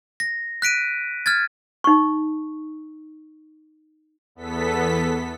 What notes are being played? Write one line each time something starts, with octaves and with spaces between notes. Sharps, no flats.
A#6
F#6 B6 D7 D#7
F6 G#6 A6
D#4 C#6
E2 B3 A4 B6